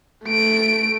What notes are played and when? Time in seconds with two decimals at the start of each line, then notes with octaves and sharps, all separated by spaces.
0.25 A3 D7